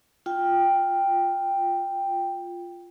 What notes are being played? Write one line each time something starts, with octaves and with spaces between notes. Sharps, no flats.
F4 G5